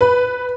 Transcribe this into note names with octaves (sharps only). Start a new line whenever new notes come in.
B4